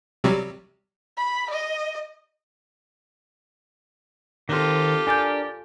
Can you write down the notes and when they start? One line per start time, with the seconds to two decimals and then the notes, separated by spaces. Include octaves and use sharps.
0.24 C3 F#3 G3
1.17 B5
1.50 D#5
4.49 D#3 C4 F4 G4 A4
5.07 D4 A#4 D5 G#5 D6 G6